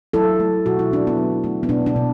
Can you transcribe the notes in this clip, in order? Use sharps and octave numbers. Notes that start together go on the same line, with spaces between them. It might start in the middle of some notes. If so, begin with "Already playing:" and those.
F#3 E4 A4
A3
B2 F#4
E4
B2 D4
B3 E4
F#3
A3
B3
B2 D4
D4
B2